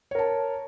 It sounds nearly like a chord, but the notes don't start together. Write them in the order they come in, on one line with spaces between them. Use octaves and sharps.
C#5 A#4 A5